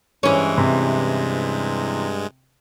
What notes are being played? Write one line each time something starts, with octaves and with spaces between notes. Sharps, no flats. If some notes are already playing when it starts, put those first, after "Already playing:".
G2 E3 G#3 C#4
C3